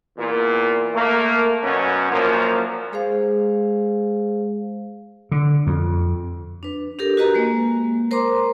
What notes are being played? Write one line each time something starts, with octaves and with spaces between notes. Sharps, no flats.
E2 A#2
A3 A#3
F#2 B2 C#4 F#4
F#2 A#2 F3 A#3
G#3 G#4 C5 F5
D3
F2
D4 B4
D4 G4 A4 A#4
F#4 G4 B4 D#5 A#5
G#3 A#3
A#4 C5 A#5 C6 D6